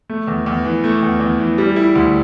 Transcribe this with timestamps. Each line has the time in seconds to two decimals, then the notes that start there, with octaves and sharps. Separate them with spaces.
0.09 A3
0.27 E2
0.46 E2
0.65 E3
0.84 A3
1.02 E2
1.20 E2
1.40 E3
1.58 G3
1.76 E4
1.95 D2